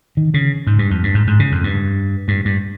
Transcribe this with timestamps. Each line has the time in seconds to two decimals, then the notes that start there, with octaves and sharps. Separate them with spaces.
0.17 D#3
0.34 C#3
0.67 G#2
0.79 G2
0.90 F2
1.03 G2
1.14 G#2
1.27 G#2
1.39 C#3
1.52 F2
1.64 G2
2.28 G2
2.45 G2